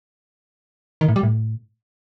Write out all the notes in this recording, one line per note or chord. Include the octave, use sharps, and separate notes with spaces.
D#3
A2
G3
A2